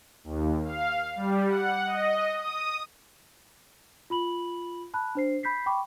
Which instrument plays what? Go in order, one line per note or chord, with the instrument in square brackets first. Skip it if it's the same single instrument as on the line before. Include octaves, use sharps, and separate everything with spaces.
[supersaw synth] D#2
F5
G3
F#5
D#5
D#6
[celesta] F4 B5 F#7
A5 B5 F#6
D4 C5 C7
B5 G6 B6 C7
G5 B5 C#6 D6